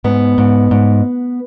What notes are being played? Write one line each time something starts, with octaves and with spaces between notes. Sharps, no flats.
G#2 B3
G#2
G#2